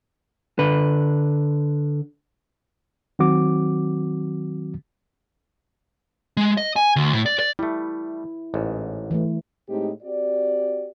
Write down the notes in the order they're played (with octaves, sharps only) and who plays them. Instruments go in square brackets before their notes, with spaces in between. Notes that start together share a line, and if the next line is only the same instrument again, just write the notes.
[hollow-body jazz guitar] D3 B4
[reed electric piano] D#3 F#3 C4 F#4 D6
[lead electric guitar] G#3
D#5
G#5
D2
A2
D5
D5
[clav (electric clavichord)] G3 A3 [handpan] E4
[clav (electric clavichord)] A1 G#2
[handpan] E3 A3
[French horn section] A2 G#3 A3 C4 D#4 G4
C4 F#4 G4 D5